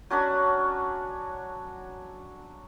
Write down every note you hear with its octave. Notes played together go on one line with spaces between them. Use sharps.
F#3 C#4 D4 B5